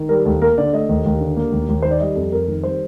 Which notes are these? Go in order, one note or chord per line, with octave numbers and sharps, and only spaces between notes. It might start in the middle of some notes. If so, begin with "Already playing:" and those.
Already playing: D#3
G3 A#4
D#2 A4
A#3 A#4
D3 D5
A3 D#5
D#2
D#2
D3
A#3
D#2
D#2
D#3 C5
D5
G3 D#5
F2 A4
F2 A#4
D#3
G3 C5